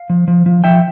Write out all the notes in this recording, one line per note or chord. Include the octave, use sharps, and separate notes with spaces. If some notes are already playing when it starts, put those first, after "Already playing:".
Already playing: F5
F3
F3
F3
F3 E5 G5